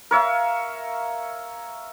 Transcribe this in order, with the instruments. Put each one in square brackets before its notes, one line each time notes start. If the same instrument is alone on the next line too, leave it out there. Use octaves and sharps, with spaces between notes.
[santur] A#4 C#5 E5 F5